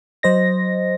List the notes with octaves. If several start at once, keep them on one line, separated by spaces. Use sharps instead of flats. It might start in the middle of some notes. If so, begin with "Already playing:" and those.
F#3 C5 D#5 A#6